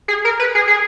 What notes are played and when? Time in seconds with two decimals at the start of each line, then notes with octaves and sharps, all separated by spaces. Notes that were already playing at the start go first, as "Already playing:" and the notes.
0.08 G#4
0.25 A#4
0.39 B4
0.55 G#4
0.68 G#4